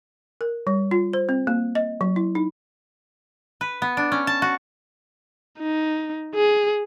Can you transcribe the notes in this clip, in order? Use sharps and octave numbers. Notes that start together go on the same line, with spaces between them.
A#4
G3
F4
C5
C4
A#3
D#5
F#3
E4
D#4
B4
B3
D4
C#4
A5
F#4
D#4
G#4